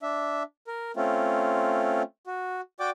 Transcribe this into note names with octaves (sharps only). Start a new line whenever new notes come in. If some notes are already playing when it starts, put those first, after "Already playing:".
D4 E5
A#4
A3 C4 C#4 F4
F#4
F#4 D5 G5 D6